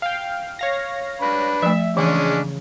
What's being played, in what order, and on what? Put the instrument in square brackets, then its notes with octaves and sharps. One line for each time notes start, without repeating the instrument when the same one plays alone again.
[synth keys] F5 G5
C#5 F5 A#6
[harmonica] D4 B4 B5
[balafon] F3 A3 [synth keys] E5
[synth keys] C#3 [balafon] E3 [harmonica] G#3 C#4 D4